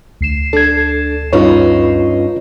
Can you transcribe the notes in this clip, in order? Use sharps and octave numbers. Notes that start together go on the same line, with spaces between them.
D2 C7 E7
D4 A4 G#6
G2 C#4 D#4 F4 B4 C#5